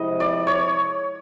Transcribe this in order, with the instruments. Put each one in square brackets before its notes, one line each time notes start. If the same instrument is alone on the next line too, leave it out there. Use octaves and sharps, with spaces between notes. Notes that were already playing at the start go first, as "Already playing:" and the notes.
Already playing: [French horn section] C3 F3 G#3 C4 E4 [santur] D#5
[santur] D5
C#5